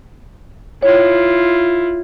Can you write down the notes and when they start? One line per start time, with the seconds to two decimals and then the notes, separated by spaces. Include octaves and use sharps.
0.83 E4 F4 C#5